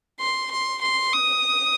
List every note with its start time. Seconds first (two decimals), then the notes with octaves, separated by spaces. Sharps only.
0.20 C6
0.51 C6
0.82 C6
1.13 D#6